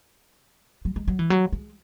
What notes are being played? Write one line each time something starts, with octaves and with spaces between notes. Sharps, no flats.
F#3
G#3
F#3
E3
F#3
G#3